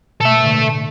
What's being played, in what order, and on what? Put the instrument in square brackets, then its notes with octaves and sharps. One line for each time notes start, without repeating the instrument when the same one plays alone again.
[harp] B2 [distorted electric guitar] A4 E5
[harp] A2 D3